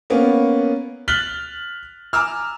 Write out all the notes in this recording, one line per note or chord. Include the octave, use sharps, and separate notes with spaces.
A#3 B3 C#4
F6 F#6 A6 B6 F#7 G7
G#5 A#5 D6 E6 F6